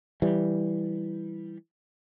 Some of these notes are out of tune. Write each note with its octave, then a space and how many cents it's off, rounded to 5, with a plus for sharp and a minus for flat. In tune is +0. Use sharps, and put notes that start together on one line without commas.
E3 +0 G3 +0